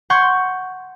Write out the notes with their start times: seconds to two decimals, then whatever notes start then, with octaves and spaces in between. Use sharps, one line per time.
0.10 F#5 C6 C#6 G6 G#6